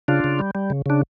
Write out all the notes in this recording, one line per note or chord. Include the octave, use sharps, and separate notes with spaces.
C#3 D4 F4
C#3
G3
G3
C#3
C#3 D4